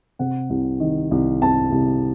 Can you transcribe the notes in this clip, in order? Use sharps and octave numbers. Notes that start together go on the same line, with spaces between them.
C3 F#5
C2
D#3
C2
C3 A5
C2